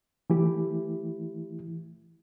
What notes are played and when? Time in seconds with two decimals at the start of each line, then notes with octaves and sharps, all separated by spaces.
0.30 E3 A3 E4 G4